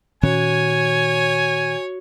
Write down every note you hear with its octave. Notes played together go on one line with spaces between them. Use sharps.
A#2 D#3 C#4 F#4 C#5 G#5